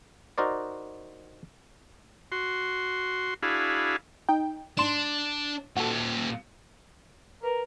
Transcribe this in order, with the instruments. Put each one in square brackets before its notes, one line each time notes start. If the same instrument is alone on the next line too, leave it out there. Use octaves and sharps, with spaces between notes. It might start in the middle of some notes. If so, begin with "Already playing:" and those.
[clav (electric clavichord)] D#4 F#4 A#4 C5 D5
[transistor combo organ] F#4 C6
D4 E4 F#4 G#4 F5 B5
[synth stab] D#4 G5
[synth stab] G#2 C6 E7 [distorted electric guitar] D4
[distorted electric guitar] A#2 G4 [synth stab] F#4 A4
[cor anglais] A#4 [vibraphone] B4